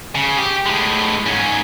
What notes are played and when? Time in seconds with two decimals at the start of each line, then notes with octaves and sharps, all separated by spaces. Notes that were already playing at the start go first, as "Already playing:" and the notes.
0.15 C#3
0.38 G4
0.66 A2 G#3
1.26 G#2 C#4